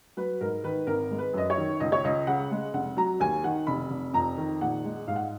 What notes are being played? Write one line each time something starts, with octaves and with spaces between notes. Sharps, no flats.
F#3 B4
G#2 A#4
D#3 B4
G#1 A#4
G#3
B4
F#2 D#5
C#5
D#3
C#2 D#5
C#5
C#2 D#5
C#3 F#5
G#3
F1 F#5
F#3 A#5
D#2 G#5
D#3 F#5
F1 B5
F1
F2 A#5
D#3
A#1 F#5
G#3
G#2 F5
F#5